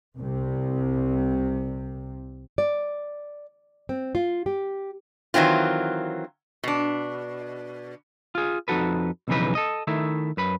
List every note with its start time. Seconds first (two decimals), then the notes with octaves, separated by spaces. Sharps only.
0.19 C2 C3
2.58 D5
3.89 C4
4.15 F4
4.46 G4
5.34 D#3 E3 F#3 C4 F4
6.64 B2 D4
8.35 F4 G#4
8.68 F2 D#4 F#4 A4 B4
9.28 B1 F2 C#3 E3 D#4 B4
9.55 A4 D#5
9.87 D#3 A3 E4
10.37 F#2 B4 B5